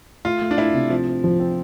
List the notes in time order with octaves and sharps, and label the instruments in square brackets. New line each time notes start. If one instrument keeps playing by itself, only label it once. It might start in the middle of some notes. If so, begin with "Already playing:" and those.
[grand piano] A3 [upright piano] F4
[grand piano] A3
[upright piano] D4
[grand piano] A3 [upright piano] E4
[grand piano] C3
[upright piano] F3 [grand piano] C4
[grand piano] C4
F3
C4